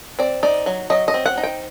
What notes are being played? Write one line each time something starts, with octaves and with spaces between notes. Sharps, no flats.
C4 D5
D#4 D5
F#3
F#3 D#5
D#5
C4
F#5
D#4
G5